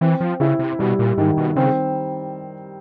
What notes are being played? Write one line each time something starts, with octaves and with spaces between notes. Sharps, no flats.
E3 C4
F3
C#3 E4
C3
B2 G3
A#2
G#2 D#3
B2
C#3 C4